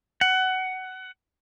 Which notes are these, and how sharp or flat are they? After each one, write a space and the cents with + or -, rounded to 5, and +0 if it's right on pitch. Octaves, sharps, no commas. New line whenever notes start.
F#5 +20